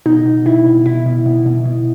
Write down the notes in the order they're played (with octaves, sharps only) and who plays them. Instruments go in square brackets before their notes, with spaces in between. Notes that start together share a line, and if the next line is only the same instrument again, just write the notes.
[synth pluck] B2 D#4
B2
B2 E4
B2
B2 E4
B2
B2
B2
B2